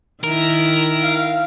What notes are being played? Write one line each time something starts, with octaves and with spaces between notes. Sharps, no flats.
D#3 E4 A#4
F5